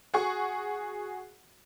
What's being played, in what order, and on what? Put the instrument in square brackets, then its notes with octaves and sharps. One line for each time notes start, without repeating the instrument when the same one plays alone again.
[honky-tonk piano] F#4 G#4 F#5 C#6